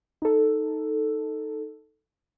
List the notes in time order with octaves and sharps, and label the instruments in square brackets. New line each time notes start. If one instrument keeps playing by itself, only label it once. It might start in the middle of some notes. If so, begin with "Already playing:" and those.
[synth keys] D#4 A4